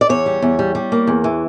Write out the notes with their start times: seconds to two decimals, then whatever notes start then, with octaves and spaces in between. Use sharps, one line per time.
0.01 D5
0.09 E2 C#5
0.26 G3
0.42 E2
0.59 G3
0.75 G3
0.92 A#3
1.07 E2
1.24 E3